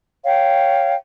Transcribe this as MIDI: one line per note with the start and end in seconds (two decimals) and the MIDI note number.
0.24 0.95 73
0.24 0.95 77
0.24 0.95 79